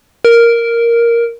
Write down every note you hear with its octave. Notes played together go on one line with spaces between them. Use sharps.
A#4